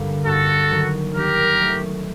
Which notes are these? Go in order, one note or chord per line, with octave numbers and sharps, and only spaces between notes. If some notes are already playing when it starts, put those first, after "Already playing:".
Already playing: G2 D3 G3 A#3
G2 F#4 A4
D#3 F#3
D#3 G4 A#4
F#3 A3